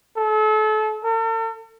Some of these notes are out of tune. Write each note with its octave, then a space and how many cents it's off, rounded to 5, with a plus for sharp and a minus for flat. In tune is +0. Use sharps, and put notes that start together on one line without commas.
A4 -35
A4 +45